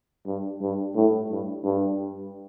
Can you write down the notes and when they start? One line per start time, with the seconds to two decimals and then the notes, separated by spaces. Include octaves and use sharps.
0.26 G2
0.62 G2
0.96 A2
1.30 G2
1.64 G2